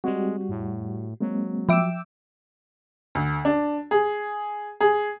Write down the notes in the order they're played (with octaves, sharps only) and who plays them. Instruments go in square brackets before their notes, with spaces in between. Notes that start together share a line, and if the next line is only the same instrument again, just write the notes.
[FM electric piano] G3 F#4 [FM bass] G#3 [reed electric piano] C4
[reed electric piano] F2 [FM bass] A2
[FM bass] F#3 [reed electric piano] G#3 A#3 C4
[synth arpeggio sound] F3 E5 D7 [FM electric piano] G5 D6 E6
[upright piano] D2
D4
G#4
G#4